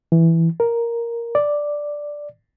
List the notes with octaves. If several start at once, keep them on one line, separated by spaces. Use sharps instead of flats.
E3
A#4
D5